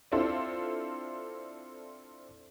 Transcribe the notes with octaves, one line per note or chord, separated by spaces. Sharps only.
C4 D4 E4 F4 A4 C5